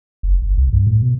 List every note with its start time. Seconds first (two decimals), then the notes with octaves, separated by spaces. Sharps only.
0.23 F#1
0.42 G1
0.58 C2
0.73 G2
0.87 A2
1.02 B2